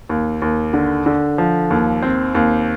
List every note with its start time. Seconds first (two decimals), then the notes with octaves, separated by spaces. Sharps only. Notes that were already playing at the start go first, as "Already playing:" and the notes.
0.09 D#2
0.42 D#2
0.73 D3
1.06 D3
1.38 F3
1.70 D#2
2.02 C4
2.35 D#2